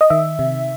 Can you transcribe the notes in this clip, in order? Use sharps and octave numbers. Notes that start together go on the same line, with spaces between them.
D#5
D#3 E5
C3